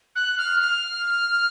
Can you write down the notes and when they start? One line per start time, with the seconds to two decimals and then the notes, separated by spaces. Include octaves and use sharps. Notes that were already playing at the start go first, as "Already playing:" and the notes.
0.16 F#6
0.38 F6
0.60 F6